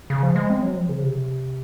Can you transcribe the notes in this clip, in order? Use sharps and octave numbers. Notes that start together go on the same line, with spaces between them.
C#3
F3
G#3
C4
F#3
F3
C#3
C3